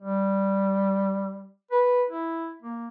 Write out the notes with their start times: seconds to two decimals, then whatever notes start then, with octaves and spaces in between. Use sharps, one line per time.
0.02 G3
1.71 B4
2.10 E4
2.62 A#3